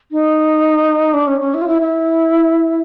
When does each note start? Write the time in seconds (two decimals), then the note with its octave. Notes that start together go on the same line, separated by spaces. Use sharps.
0.12 D#4
1.14 D4
1.27 C#4
1.41 C#4
1.54 E4
1.62 F4
1.68 E4
1.81 E4